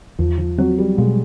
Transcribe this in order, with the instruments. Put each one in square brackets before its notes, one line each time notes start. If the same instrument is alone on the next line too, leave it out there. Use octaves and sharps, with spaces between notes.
[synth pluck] E2 [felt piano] F3
[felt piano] F3
[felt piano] F#3 [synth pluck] C4
[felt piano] G3
[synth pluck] B2 [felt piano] G#3